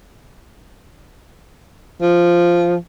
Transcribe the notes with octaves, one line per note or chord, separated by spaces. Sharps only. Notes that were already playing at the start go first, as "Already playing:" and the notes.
F3